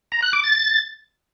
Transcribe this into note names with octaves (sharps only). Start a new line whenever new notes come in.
A#5
F#6
D6
A6